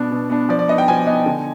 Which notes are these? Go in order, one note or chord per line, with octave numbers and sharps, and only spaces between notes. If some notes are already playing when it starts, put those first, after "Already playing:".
Already playing: B2 B3 D4
B2
B3 D4
F3 D5
D5
B3 D#4 D#5
G5
F3 G#5
B3 D#4
D3